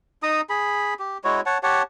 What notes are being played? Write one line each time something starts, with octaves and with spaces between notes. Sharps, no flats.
D#4 A#5 D#6
G#4 B5
G4
G#3 E4 F#4 C#5
C#5 F#5 A5
G4 C#5 F#5 A5